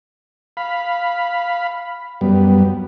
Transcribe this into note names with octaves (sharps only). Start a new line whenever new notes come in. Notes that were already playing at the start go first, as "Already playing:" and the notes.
F5 B5
F#2 G3 B3